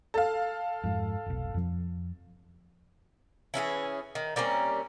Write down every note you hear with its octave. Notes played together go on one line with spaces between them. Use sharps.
A4 F5
F2 G#2
F1 B1
F2 F3
E3 C#4 E4 G#4
D#3
G3 A#3 C4 C#4